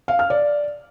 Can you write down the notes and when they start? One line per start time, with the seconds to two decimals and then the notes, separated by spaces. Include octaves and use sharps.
0.08 F5
0.19 F6
0.30 D5